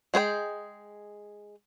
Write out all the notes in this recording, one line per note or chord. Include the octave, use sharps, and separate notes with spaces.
G#3 G#4 C5 G5